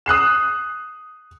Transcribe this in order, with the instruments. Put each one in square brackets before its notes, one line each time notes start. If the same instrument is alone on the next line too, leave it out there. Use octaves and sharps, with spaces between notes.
[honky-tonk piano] D#6 F#6 C7 E7